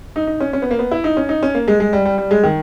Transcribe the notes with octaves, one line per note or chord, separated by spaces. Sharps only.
D#4
D#4
C#4
C#4
B3
A#3
B3
E4
D#4
C#4
D#4
C#4
A#3
G#3
G#3
G3
G3
G3
G#3
D#3